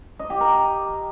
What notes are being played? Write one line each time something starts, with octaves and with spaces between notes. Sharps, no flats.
D#5
G4
A#4